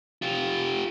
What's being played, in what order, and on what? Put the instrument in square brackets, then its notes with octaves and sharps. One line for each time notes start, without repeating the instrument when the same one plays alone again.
[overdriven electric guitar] F4 G4